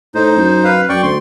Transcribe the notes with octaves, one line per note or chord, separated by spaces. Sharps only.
A2 D#4 C5
F#2
B4 F5
F#2 D5 G5 C#6
D2 C6